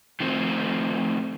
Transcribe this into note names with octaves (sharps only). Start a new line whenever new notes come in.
D#3 F3 A3 C4